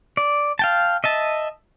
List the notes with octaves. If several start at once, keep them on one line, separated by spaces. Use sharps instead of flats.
D5
F5 G5 A5
D#5 E5 A5